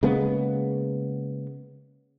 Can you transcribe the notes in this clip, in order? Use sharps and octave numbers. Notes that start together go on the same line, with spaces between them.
C#3 G#3 A#3 B3